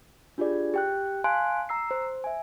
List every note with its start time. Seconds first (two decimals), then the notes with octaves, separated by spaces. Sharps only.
0.38 D4 F4 G4 G#4 D5
0.74 G4 G5 F#6
1.24 F5 G#5 A5 C6 F#6 D7
1.69 A#5 E6 C7
1.91 C5
2.24 E5 G#5